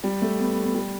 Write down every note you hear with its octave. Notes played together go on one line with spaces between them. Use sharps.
G3
A3
B3
B3
B3
G3